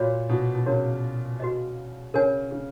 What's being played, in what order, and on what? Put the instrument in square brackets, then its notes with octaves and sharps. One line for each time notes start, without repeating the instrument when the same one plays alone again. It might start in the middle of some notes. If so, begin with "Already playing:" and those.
Already playing: [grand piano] A#2 [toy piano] F#4 C#5 F5 B5
[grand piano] B2
B2
[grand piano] C#3 [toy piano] D#4 F#4 A#4 C#5
[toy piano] F#4 B4 D#5
[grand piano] C#3 [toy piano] A#4 C#5 G#5
[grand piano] C#3